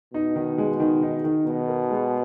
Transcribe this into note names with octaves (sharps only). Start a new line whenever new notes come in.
B2 D#4
D#3
G#3
D#3
D#4
D#3
B2 D#4
A#4
G#3